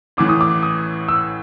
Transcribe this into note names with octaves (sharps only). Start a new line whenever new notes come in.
A1 A2 E3 D6
D#6
D6
D#6
E6